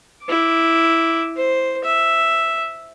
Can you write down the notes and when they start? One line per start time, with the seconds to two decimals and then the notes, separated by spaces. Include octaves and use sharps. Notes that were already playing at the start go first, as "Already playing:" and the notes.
0.24 E4 D6
1.36 C5
1.85 E5